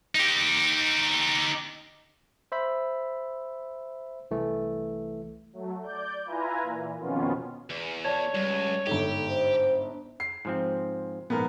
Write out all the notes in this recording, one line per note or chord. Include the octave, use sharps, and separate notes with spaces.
D#4 G4
C5 E5 B5 B6
C2 E3 A3
F#3 A3
D5 G6
E4 F4 B4 G#5 A#5
A#2 E3
F2 B2 D#3 B3 C#4 F4
E2
C#5 D5 A5
C#2 G3
G1 G#2 G4 A4
C5
C7
G#2 F3 C4
A#1 G#2 B3 A#4